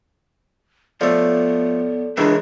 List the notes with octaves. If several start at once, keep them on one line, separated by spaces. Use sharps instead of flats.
F3 A3 B3 A4 C#5 D5
C#2 D#3 E3 D4